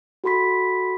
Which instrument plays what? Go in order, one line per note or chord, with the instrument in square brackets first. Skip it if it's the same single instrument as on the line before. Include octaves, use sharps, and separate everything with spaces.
[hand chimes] F#4 A4 B5 C6 B6